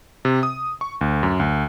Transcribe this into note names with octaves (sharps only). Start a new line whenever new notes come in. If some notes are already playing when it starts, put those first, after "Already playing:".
C3
D#6
C#6
D2
F#2
D2